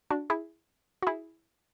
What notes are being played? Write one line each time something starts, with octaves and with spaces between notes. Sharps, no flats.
D4 F#4
E4 G#4
F#4
E4 G#4